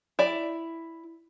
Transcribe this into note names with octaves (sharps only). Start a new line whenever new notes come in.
E4 D5